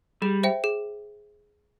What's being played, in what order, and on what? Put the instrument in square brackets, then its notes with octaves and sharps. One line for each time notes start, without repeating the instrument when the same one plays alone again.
[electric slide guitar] G3 [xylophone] G#4
[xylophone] C5 E5 G5
G#4